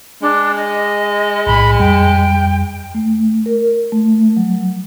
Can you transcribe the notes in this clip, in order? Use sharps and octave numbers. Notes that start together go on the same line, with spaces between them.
G#3 D4
D#5
B1 A2 B5
F2 G3 G5
A3
A#4
A3
F#3